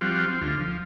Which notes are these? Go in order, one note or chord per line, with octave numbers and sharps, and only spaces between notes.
F3 G3 C4 F4 F#4
C4
D2 F4
F3